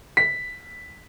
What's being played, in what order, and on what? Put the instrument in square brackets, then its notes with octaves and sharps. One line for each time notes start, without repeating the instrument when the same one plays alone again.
[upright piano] B6